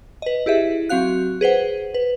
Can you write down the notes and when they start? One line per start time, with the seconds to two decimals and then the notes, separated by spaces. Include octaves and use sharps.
0.22 B4 D#5
0.46 E4 G4 G#4 E5
0.89 F#3 C4 F#4 F5 F#6
1.41 G#4 B4 C5 F#5
1.94 B4